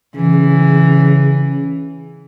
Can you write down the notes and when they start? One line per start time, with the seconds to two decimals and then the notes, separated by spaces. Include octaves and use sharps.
0.16 C#3 E3